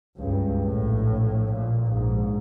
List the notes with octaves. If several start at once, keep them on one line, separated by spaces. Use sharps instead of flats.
C#2 G2
A#1 A2
A#2
A#1 G#2